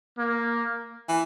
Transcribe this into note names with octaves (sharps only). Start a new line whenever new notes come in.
A#3
E3